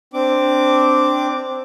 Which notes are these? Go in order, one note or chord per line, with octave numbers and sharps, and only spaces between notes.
C4 D4 D6